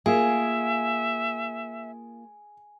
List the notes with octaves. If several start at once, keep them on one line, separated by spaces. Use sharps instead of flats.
A#3 F4 G#4 E5 G#5